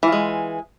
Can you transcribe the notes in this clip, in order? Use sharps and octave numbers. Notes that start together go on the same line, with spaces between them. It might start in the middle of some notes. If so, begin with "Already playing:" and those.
E3 G#3 F4